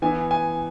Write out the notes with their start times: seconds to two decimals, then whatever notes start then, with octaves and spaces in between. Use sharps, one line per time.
0.02 E3 B3 E4 G#5
0.31 G#5